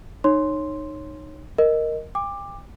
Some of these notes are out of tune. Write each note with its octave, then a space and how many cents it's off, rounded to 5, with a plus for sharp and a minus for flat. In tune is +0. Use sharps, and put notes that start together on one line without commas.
D#4 -20 C#5 -15 C6 +0
A#4 +0 D#5 +0
G5 +40 D6 +10